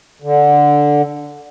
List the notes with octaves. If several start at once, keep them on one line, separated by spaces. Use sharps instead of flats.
D3